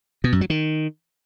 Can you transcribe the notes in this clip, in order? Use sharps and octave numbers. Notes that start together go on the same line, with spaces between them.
B2
F#2
F#3
D#3